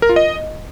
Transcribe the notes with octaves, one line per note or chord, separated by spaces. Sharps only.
A#4
F4
D#5